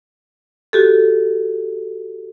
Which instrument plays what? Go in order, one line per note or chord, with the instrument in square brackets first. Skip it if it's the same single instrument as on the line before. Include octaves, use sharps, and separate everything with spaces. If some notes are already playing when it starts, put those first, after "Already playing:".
[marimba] F#4 G4 A4